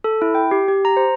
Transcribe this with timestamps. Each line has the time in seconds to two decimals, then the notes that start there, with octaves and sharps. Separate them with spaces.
0.04 A4
0.22 E4
0.35 G5
0.51 G4
0.68 G4
0.85 A#5
0.97 C5